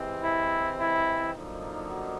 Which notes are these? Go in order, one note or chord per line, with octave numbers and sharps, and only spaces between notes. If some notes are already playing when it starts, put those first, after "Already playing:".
Already playing: C3 E3 G#3 C4
E4
E4
F#2 D3 F3 A#3 D#4
F#4